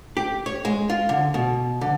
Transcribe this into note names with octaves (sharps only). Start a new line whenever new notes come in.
G4
C#5
G#3
F4
D3
B2
D3